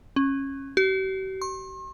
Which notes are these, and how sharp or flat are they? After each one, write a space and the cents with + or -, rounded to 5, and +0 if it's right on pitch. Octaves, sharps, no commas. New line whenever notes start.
C#4 -20
G4 -45
C6 +45